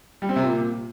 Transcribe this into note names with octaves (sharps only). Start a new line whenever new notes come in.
G3
C4
C3
A#2